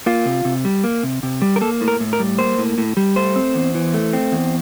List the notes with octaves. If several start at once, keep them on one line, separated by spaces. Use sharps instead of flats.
A#3 F4
C3
C3
G3
A#3
C3
C3
G3
A#4
A#3 A4
A2
A#4
A2
A#4
G3
A#3 C5
A2
A2
G3
A3 C5
C4
E2
E3
A3
C4
E2